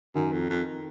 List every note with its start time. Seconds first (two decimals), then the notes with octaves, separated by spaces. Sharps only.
0.15 F#2 D#3
0.32 F2
0.49 F2